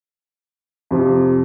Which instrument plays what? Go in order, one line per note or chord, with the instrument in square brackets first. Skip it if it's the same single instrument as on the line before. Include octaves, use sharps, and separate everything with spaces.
[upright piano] F2 C3 F3